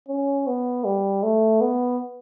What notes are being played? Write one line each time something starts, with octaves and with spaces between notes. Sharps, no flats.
C#4
B3
G3
A3
B3